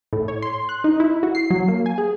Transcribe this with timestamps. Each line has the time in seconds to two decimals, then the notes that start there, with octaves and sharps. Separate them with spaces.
0.13 A2
0.28 C#5
0.42 C6
0.69 F#6
0.84 D#4
1.00 E4
1.23 F#4
1.35 C7
1.50 F#3
1.68 A#3
1.86 G#5
1.98 G#4